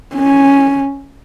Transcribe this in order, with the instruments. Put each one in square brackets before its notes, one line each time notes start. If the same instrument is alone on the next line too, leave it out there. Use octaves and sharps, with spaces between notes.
[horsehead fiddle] C#4